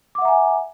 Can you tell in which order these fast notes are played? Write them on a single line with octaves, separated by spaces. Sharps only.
D6 F#5 E5 A#5 G#5